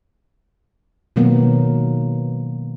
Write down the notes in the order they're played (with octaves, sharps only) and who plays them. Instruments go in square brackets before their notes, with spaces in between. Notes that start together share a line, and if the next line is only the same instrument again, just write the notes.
[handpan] B2 D#3 F#3 A#3 B3